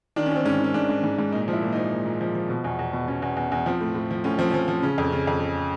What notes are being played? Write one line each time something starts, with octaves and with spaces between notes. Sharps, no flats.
D#3 D4
C#4
D#3 C4
G#2 C#4
D#3 C#4
G#2 D4
G#2
G#2
G#2
A#2 D#4
F3
E4
A#2
F3 D#4
A#2
A#2
F3
F3
B2
E2
E2
B2
B2 C#4
E2
E2
E2
F3 C4
A2
A2
F3
A2 C#4
F3 C4
F3 C#4
F3
C#3 C#4
F2
C#3
F2
C#3